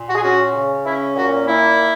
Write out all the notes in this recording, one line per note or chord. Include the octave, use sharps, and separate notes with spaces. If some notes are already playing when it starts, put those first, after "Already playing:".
Already playing: A#2
F#4
G#4
C#4 F#4
C#3
C#4 E4
A#2 F#4
A#3 E4